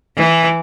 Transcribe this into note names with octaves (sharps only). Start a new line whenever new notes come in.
E3